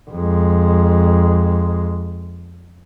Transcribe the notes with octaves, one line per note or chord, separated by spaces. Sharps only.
F2 G#3